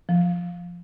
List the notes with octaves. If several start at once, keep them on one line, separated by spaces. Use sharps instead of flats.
F3